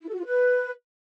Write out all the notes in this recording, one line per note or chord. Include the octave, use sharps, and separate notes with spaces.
E4
A4
F#4
F4
B4